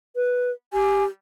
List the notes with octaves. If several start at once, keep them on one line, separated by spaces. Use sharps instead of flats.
B4
G4 G#5